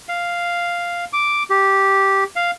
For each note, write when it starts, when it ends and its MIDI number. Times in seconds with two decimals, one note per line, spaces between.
0.09 1.05 77
1.13 1.43 86
1.50 2.24 67
2.36 2.51 77